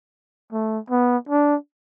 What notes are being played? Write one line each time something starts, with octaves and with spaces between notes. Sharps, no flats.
A3
B3
D4